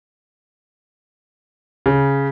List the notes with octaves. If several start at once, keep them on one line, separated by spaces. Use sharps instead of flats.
C#3